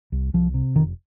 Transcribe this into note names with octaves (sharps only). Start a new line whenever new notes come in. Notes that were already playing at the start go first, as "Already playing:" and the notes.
C2
C2 F3
C3
F1 D#3